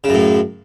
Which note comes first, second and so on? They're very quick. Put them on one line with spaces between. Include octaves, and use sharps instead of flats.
C#3 F#2 A2